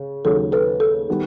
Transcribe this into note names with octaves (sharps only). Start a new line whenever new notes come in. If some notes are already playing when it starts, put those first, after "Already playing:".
Already playing: C#3
D#2 C#3 F#3 A4
A4 B4
A4
D#3 G3 B3